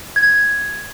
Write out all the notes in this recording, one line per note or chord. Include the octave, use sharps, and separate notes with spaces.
G#6